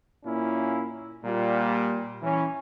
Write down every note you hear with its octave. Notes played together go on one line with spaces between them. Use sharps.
A#2 A#3 C#4 E4
A#2 G3
E3 C#4